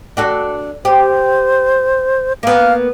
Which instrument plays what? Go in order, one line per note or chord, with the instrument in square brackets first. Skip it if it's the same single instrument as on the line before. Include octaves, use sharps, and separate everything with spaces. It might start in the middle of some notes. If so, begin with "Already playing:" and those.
[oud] D4 F#4 A4
[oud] G4 [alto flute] C5
[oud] A#3 B3 [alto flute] F5